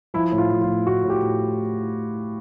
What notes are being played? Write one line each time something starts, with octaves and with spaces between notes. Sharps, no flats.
F3 E4
A2
F4
F3
F4
A2
A2 F#4
A2
G4
A2